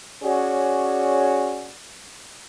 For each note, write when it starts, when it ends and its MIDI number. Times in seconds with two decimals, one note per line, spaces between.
0.23 1.74 61
0.23 1.74 66
0.23 1.74 68
0.23 1.74 73
0.23 1.74 74